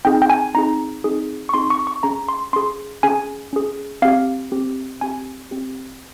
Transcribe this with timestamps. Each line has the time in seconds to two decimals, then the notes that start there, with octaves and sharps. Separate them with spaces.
0.05 C4 D#4 G#4 G5
0.22 G5
0.30 G#5
0.55 C4 D#4 G#4 A#5
1.04 C4 D#4 G#4
1.49 C#6
1.54 C4 D#4 G#4 C6
1.70 C#6
1.87 C#6
2.03 C#4 G#4 A#5
2.29 C6
2.53 C#4 G#4 C6
3.03 C#4 G#4 G#5
3.53 C#4 G#4
4.02 C4 G4 F5
4.52 C4 G4
5.01 C4 G4 G#5
5.51 C4 G4